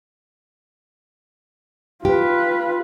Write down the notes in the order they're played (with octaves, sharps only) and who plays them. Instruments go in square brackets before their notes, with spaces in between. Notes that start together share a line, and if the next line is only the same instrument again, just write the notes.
[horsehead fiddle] F4 B4 [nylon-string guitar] G4